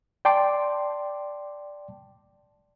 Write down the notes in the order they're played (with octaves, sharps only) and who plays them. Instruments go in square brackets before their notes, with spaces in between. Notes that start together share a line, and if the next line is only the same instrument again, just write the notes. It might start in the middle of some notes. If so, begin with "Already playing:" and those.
[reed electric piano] D5 G5 A5 C6 D6